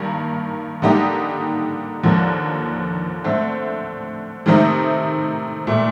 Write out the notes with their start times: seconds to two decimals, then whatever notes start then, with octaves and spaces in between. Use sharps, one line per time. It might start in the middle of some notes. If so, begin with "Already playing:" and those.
Already playing: G2 D#3 A#3
0.82 D3 G3 A#3 D#4 G4
2.03 D#2 D3 F3 A#3
3.24 D3 A3 C4
4.46 C3 D#3 A3 C4 D#4
5.67 A#2 A3